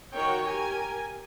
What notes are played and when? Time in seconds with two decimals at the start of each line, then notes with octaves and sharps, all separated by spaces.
0.14 D#3 F#4 A#4 C#5 G5
0.47 G4 A#4 G#5